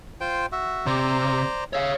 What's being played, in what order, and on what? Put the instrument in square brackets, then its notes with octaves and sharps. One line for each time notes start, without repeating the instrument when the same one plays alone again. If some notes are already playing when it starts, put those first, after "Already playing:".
[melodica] F4 C5 G5
F#4 E5
[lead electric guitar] C3 [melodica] C5 D5 A#5
[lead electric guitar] C#5 F5 [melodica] E5